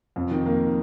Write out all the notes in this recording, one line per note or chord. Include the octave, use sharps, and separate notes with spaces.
F2
D#3
A#3